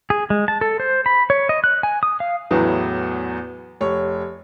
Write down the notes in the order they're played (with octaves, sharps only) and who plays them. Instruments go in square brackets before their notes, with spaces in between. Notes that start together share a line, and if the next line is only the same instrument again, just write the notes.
[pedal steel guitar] G#4
G#3
A5
A4
C5
B5
C#5
D#5
F#6
G#5
D#6
F5
[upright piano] E2 A2 F#3 B3
F1 C#5